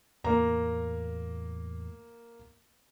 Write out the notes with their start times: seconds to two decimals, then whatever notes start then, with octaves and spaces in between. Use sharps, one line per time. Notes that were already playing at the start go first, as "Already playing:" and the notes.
0.24 E2 A2 A#3 A#5